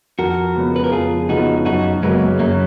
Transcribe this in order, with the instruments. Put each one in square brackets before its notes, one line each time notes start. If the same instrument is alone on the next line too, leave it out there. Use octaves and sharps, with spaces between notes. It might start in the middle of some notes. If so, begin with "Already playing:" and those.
[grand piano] F2 [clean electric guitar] F#4 A#4
[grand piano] C#3 G#3 B3 F4
[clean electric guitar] B4
A#4
[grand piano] F2 [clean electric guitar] F4 G#4
[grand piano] C#3 G#3 B3 F4 [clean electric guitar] D#4 F#4
[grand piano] F#2 [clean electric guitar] D#4 F#4
[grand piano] C#3 F#3 A#3 [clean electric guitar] G#3 B3
[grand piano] F#2 [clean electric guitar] F#3 A#3